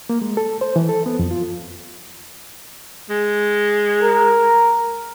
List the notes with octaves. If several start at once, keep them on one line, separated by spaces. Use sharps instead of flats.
A#3
G#3
A4
C5
E3
A4
B3
F2
F4
G#3
A#4